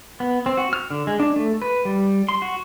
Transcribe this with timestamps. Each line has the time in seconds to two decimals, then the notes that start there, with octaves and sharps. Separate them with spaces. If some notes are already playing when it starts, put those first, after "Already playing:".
0.20 B3
0.46 C4
0.57 F#4
0.73 F6
0.90 D3
1.07 G#3
1.20 D4
1.36 A3
1.62 B4
1.85 G3
2.29 C6
2.42 F#4